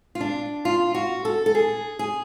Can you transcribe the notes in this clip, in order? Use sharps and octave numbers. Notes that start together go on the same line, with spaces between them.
F4
D4
F4
F#4
A4
A4
G#4
G#4